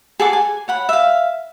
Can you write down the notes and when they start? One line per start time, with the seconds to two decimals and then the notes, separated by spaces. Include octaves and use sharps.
0.19 G#4 A4 F#5 D6
0.33 G#5
0.68 C#5 F#5 B5
0.89 E5 F5